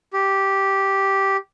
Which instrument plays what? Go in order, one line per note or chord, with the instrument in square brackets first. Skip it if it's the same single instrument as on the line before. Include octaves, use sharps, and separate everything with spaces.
[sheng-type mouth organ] G4